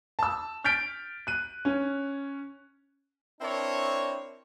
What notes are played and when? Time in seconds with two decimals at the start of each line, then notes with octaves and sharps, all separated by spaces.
0.19 A5 E6
0.64 F6 G6 A6 B6 D7
1.27 F#6 D#7
1.65 C#4
3.41 C4 D4 E4 A#4 C#5